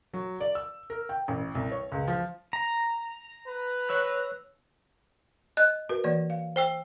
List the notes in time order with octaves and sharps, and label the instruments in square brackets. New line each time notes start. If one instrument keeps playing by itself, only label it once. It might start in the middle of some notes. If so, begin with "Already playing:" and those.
[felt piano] F#3
D5
E6
A#4
G5
A1
C2
C#5
C#2
F3
[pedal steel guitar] A#5
[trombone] B4
[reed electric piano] C#5 E6 F#6
[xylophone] D#5 F#6
[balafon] F#4 A#4 B4
E3 A#3 D5
F5
[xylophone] C5 G5 E6